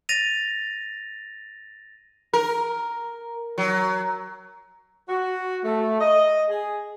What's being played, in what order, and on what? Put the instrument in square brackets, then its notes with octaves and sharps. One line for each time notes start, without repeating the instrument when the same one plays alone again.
[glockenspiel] A6 A#6 D#7 F7
[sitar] A#4
F#3
[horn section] F#4
A3
D#5
G#4